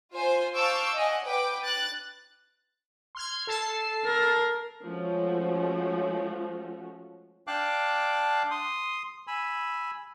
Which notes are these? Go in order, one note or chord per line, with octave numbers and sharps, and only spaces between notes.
F4 C5 G#5
F5 A5 C#6 D6 E6 G6
D#5 F#5 G#5
B4 G5 D6
F#6 A6
C6 F6 G#6
A4 A5 C7
A#4
F3 G#3 A3 C#4 F#4
D4 F5 G5 A5 D6 F#6
C6 D#6
G#5 B5 E6